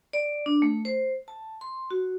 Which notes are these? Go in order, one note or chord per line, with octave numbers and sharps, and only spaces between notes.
D5
D4
A3
C5
A5
C6
F#4